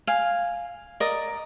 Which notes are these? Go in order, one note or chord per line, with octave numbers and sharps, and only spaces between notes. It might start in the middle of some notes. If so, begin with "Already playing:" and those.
F5 G#5
A#4 D5 D#5 D#6